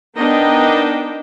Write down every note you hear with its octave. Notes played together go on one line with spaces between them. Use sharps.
B3 D4 D#4 A#4 D#5 G5